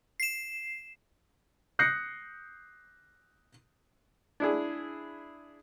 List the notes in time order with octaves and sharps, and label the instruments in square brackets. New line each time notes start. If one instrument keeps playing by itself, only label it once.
[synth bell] C7 E7
[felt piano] D#6 F#6 G6 A#6 C7 C#7
[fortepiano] D4 E4 G#4